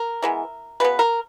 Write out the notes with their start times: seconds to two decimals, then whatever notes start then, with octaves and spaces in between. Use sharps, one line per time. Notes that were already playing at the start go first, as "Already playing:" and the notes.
Already playing: A#4
0.22 E3 G#3 B3
0.80 C#3 F#3 B3 B4
0.99 A#4